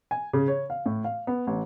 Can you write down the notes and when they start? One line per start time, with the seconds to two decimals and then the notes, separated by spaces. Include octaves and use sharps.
0.11 G#5
0.33 C#3
0.48 C#5
0.70 F5
0.86 A2
1.04 F5
1.27 B3
1.47 A1